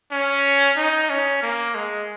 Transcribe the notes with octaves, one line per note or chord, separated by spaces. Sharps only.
C#4
D#4
C#4
A#3
G#3